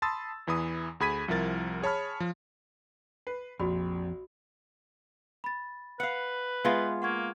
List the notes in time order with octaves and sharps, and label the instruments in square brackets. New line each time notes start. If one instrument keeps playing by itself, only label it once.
[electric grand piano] A5 B5 C6 D#6 E6 A6
E2 E3 B5 D#6
D2 G#4 B5 G#6 B6 D#7
C2 F3 E4 A#4 A6
G#4 C#5 A5 B5 F6
F3
[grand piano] B4 C7
[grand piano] A#1 [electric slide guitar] F2 [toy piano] F#4 B5
[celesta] B5 A6
[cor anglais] B4 [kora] F5 F#5
[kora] G#3 B3 F4 [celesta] E5 F5
[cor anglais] A#3 [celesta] F#5 C#6 G#6